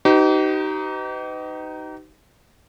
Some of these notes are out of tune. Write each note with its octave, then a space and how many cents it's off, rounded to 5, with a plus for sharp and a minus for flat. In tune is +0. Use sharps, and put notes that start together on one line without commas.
D#4 +0 G4 -40 B4 +40